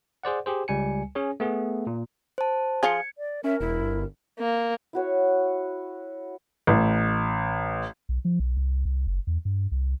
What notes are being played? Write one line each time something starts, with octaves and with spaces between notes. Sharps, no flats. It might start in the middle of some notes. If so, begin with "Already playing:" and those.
G#4 C5 D5 F#5
G4 G#4 C5
C#2 G3 G#5 C#7
C#4 G#4 C#5
A3 B3 G#4
A#2
C5 A5
F3 F4 G#4 G#6 C#7
D5
C#4 A#4 E5
E1 E4
G1
A#3
E4 F#4 C#5
A1
B1
F3
B1
C2
C2
F#1
E2
G2
C2